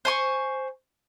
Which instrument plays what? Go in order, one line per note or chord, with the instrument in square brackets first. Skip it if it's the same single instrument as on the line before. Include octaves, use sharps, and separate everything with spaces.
[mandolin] C5 G#5 C#6